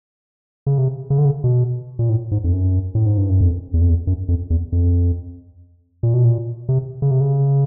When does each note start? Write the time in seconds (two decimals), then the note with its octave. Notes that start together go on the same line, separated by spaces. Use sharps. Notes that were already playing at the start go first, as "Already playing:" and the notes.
0.66 C#3
0.78 C3
1.10 C#3
1.18 D3
1.25 C#3
1.44 B2
1.99 A#2
2.09 A2
2.31 G#2
2.44 F2
2.53 F#2
2.95 A2
3.06 G#2
3.18 G2
3.30 F#2
3.41 F2
3.74 E2
3.81 F2
3.89 E2
4.07 F#2
4.28 F2
4.50 E2
4.72 F2
6.03 A#2
6.14 B2
6.24 A#2
6.69 C3
7.02 C#3
7.11 C3
7.21 C#3